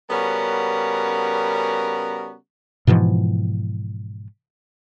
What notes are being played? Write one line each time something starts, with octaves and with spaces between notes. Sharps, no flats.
C#3 G3 B3 C#4 F#4 A#4
G#2 B2 E3 F3